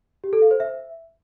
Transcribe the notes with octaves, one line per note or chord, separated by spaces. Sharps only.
G4
A4
F5
C5
E5